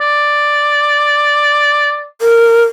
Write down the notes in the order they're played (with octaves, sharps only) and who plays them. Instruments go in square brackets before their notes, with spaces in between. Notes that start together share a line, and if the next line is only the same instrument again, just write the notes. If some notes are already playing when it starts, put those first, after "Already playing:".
[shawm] D5
[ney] A#4